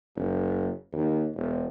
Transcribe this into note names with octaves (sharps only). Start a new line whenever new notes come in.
F#1
D#2
E1